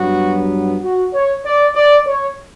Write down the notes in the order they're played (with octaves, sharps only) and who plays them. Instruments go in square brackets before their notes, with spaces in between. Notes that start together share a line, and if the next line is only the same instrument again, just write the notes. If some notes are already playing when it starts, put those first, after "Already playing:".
Already playing: [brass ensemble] G2 F#3 B3 F#4
F#4
C#5
D5
D5
C#5